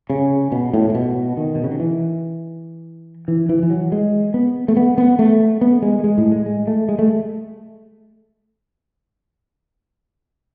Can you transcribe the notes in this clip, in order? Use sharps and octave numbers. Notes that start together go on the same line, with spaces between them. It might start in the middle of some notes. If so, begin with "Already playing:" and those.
C#3
B2
A2
A2
B2
D#3
B2
C#3
D#3
E3
E3
E3
E3
F#3
G#3
B3
A3
B3
B3
A3
B3
G#3
A3
G#3
A2
G#3
G#3
A3
G#3
A3